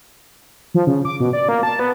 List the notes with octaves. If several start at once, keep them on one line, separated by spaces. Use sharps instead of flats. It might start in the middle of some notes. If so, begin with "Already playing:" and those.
F3
C#3
D6
B2
D5
A#3
A5
B3